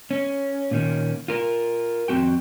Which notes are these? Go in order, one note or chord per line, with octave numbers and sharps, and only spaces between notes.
C#4
A#2 D#3 C#4
F4 A#4
F2 C4 F#4 G5